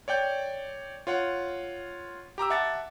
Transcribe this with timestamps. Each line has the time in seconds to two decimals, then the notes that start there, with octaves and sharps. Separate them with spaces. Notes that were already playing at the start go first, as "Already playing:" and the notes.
0.08 C#5 D5 G5 G6
1.07 F4 C#5 F#5
2.38 G4 A#5 D6 E6
2.50 E5 F#5 A5 D6 A6